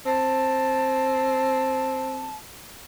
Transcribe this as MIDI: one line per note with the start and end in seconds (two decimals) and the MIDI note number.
0.06 2.34 60
0.06 2.36 81